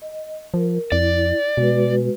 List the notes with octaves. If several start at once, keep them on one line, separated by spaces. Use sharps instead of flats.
D#5
F3 A#4
F2 E4 D5
B2 G#3 F#4 B4